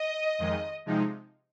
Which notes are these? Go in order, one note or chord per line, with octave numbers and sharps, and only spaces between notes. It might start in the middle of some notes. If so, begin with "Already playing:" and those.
Already playing: D#5
F2 D#3 G#3
C3 F3 G#3 D#4